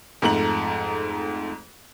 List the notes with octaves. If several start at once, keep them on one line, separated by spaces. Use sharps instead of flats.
F2 G#2 A3 A#5 F#7